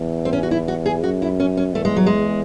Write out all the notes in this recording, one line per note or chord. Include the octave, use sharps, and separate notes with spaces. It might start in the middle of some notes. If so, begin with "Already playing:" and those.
Already playing: E2
C4
C#4
F#4
E4
F#4
G#4
F#2 F#4
E4
C#4
C#4
E2 A3
G#3
F#3
G#3